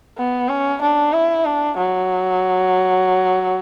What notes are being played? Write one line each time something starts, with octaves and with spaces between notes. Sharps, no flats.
B3
C#4
D4
E4
D4
F#3